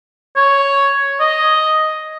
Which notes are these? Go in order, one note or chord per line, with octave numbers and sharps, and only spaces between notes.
C#5
D#5